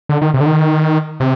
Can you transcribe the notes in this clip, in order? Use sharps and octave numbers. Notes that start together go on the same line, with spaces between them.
D3
D#3
C3
D3
D#3
C3